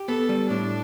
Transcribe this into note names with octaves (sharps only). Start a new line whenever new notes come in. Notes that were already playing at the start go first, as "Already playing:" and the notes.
Already playing: G4
B3 A4
G3
A2 D4